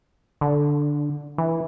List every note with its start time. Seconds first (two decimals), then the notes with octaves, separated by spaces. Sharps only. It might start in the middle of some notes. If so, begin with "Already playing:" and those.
0.41 D3
1.38 E3